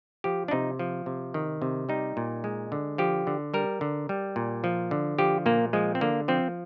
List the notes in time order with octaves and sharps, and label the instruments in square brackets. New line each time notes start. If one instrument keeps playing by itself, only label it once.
[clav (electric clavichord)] F3 G4
D4
C3 D#4
F3
C3
D#3
C3
G3 D#4
A#2
G#3
D3
F3 G4
D3
G3 A#4
D3
G3
A#2
F3
D3
F3 G4
A#2 A#3
F3 G#3
C4
D3 A#3
F3 C4